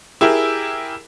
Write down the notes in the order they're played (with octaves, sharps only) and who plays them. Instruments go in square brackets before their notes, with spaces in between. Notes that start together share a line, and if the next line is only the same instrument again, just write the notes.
[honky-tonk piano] E4 G4 G#4 A#4